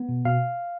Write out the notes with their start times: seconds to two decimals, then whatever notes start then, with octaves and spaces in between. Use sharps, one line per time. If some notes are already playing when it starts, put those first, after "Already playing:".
Already playing: B3
0.09 B2
0.25 B2 F5